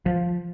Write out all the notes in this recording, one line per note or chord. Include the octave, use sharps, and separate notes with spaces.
F3